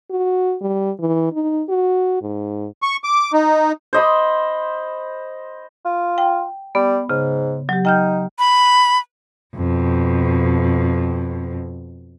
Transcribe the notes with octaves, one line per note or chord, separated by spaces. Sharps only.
F#4
G3
E3
D#4
F#4
G#2
C#6
D6
D#4
C5 D#5 B5
F4
G5
G3 B3
G#2 C#3
F#3 G4
D#4 G5 F6 G6
B5
F2 B2